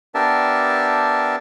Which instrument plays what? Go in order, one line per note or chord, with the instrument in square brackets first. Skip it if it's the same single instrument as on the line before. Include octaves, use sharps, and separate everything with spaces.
[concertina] B3 D4 G4 A#4 E5 A5